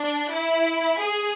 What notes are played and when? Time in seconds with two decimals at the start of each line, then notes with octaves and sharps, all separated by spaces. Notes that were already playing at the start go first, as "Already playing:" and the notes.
Already playing: D4
0.31 E4
1.00 G#4